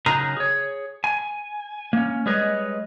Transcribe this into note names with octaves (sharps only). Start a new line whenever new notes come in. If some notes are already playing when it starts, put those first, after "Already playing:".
C#3 F#3 D#4 G#4 A#4 A#5
G#4 C#5
G#5
A#3 C#4
G3 G#3 G#4 B4 C#5 D#5